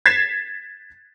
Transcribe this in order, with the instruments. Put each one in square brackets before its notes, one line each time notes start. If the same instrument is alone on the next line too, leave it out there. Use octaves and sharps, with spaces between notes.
[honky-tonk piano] G#6 A6 B6 C7 E7